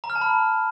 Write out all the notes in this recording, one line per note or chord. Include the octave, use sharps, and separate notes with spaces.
A#5
F6
A5
B5